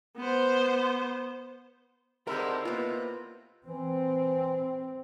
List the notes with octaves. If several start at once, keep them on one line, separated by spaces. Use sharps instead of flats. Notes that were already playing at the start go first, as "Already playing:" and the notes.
B3 C5
D3 G#3 A3 C4 D#4 E4 G4 A#4
C3 A#3 B3 F4
E3 C4